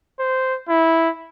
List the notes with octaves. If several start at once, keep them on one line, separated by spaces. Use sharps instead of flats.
C5
E4